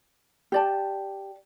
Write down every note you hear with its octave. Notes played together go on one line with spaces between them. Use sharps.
G4 D5 A5